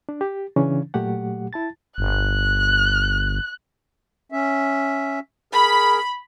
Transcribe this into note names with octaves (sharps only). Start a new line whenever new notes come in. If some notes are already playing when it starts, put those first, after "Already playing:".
D4
G4
C#3 E3 C#4 D4
A#2 F#3 A3 G4 F#5
E4 A5 A6
G1 F#6
C#4 E5
G#4 A#4 B5